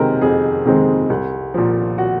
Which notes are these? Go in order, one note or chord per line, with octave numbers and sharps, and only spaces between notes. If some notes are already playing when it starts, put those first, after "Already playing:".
Already playing: C3 D#3 G#3 C4 A#4
F2 G#4
C3 D#3 G#3 C4
C2
A#2 F3
F#4